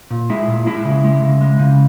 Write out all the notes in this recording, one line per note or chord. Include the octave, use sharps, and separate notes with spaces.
A#2
G#3 E4
A#2
G#3 E4
C#3
G#3
C#3
G#3
C#3